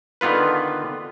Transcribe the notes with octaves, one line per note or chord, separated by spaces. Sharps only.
D3 D#3 B3 F4 B4